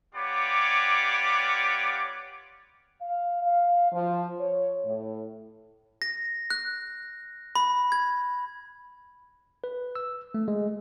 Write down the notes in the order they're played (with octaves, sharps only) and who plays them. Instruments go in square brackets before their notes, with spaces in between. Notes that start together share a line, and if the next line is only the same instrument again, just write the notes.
[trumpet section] B3 F4 G4 C#5 D5 D6
[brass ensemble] F5
F5
F3
C#5
A2
[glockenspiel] A#6
F#6
B5
G#6
[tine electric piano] B4
E6
A3
G#3